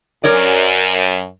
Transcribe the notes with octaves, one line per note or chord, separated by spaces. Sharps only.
F#2 A#4 C#5 D5